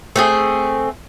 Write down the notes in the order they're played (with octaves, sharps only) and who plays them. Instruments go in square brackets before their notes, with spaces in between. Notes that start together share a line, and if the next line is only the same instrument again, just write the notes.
[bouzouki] A3 C4 G#4